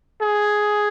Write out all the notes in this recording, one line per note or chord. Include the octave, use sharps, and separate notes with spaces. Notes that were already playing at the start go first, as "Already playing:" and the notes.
G#4